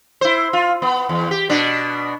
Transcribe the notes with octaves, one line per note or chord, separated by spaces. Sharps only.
E4 C5
F4
B3
E2
G4
B2 D4